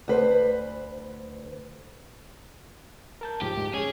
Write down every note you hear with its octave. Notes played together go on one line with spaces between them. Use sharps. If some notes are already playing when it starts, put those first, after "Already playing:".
D2 B4 C5
A#4 A5 G6
D2 G#2 F3 G4
G#2
C#4 G#4 C#5